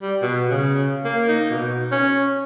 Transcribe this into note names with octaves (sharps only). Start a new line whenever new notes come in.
G3
B2
C#3
A#3
D#4
B2
C#4